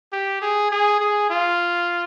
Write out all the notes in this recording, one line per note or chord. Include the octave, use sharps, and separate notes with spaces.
G4
G#4
G#4
G#4
F4